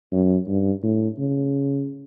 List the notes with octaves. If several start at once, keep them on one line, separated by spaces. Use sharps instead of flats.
F#2
G2
A2
C#3